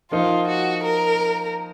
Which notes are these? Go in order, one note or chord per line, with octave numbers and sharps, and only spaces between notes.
F3 A#3 D#4 F4
F#4
A#4